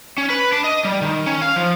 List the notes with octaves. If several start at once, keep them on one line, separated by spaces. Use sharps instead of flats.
C#4
B4
D4
D#5
G3
D#3
C#4
F5
F3